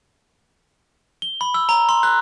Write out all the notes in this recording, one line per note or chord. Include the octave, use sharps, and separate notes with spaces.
G7
B5
E6
A#5
C6
F#6